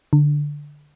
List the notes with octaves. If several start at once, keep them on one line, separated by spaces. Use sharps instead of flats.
D3